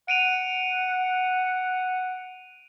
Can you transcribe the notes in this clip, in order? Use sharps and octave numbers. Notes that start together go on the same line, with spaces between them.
F#5 D7 D#7 F7